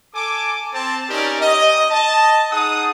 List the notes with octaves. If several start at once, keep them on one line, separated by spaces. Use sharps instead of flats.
A4 G#5 D6
C4 A5
C#4 D#4 G4 A#4 D5
D#5
D#5 A5
D#4 G#4 F#5 D#6